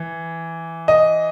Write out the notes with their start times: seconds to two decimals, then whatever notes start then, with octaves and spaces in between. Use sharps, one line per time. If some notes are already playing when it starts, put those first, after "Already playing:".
Already playing: E3
0.88 D#5